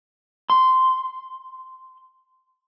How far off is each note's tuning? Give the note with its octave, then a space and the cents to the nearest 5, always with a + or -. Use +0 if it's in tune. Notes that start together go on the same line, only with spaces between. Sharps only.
C6 -10